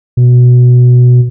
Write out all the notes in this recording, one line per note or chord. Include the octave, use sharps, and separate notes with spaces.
B2